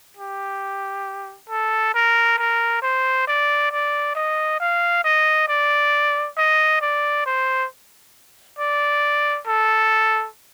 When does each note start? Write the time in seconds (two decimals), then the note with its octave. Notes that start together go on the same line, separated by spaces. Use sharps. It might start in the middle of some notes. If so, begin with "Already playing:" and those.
0.17 G4
1.50 A4
1.94 A#4
2.38 A#4
2.82 C5
3.27 D5
3.72 D5
4.15 D#5
4.60 F5
5.05 D#5
5.48 D5
6.37 D#5
6.82 D5
7.26 C5
8.59 D5
9.47 A4